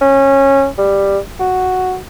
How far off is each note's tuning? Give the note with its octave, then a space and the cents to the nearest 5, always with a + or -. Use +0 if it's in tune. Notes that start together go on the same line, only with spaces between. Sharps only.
C#4 -20
G3 +10
F#4 +0